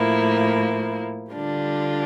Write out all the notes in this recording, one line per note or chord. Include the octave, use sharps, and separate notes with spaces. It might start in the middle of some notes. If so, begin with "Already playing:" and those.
Already playing: A2 F3 A#3 E4
D3 G3 D4 F4